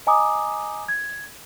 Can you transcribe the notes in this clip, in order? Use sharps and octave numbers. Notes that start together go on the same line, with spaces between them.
D#5 G#5 A#5 D6 D#6
G#6